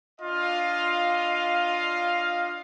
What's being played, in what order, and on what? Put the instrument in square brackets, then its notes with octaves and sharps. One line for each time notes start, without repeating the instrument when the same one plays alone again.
[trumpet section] D4 F4 D#5 F5